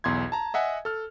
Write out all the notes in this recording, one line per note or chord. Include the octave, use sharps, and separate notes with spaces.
B1 E2 C6 G#6
A5 A#5
D#5 E5 F#5 G#5
A4 F6